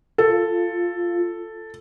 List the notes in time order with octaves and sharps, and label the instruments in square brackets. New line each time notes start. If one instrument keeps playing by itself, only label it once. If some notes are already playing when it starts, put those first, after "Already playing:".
[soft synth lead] F4 [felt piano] A4